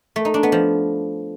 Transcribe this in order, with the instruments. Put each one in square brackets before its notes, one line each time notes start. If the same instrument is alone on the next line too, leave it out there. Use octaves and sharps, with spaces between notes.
[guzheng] A3
D#4
D4
B3
F3